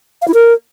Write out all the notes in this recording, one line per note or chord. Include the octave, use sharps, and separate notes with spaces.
F5
E4
A#4